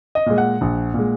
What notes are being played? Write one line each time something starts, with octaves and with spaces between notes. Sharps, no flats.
D#5
A#2 G#3
F#5
A#1
A#2 G#3